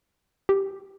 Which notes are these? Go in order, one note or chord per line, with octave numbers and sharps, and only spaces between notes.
G4